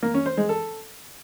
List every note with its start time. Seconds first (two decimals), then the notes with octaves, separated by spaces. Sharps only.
0.03 A#3
0.14 C#4
0.26 C5
0.37 G#3
0.49 A4